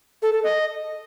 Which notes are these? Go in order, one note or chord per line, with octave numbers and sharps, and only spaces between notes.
A4
A4
D#5